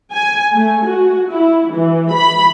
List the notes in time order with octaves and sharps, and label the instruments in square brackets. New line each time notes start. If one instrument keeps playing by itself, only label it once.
[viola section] G#5
A3
F#4
E4
E3
B5